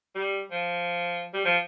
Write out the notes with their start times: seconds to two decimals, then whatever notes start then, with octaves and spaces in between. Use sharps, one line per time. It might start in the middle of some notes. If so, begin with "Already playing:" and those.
0.15 G3
0.51 F3
1.33 G3
1.45 F3